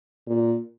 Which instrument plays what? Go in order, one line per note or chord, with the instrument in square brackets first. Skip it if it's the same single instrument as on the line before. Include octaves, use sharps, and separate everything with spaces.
[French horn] A#2